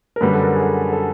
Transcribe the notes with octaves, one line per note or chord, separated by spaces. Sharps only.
A#4
F#2 D3 G3 B4
A4
A#4
G#4
A4
A4